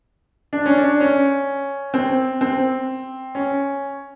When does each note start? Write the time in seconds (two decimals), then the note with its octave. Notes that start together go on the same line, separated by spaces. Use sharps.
0.53 D4
0.66 C#4
0.77 D4
1.00 C#4
1.94 C4
2.41 C4
3.35 C#4